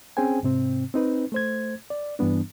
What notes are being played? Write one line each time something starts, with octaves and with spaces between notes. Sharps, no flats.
C4 C#4 G#4 C5 G5 G#5
G#2 C3 C4
C4 D#4 B4
A3 C5 G#6
D5
G2 E3 G3 B3 D4